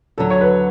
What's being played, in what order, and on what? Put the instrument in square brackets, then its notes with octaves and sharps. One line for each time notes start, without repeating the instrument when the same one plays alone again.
[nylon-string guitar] D2 D3 F#3 [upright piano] A4
[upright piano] C#5
B4